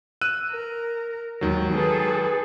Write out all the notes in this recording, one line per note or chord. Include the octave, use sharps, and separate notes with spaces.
E6 F#6 D#7
A#4
D#2 G#2 D#3 F#3
G#4 A4 B4